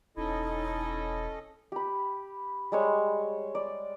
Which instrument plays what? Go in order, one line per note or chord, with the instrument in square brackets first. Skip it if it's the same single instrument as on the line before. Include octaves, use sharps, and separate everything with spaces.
[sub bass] E1 [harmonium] C#4 A4 D#5 [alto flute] D#4 [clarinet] E4
[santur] G4 B5
G3 G#3 C#5
D5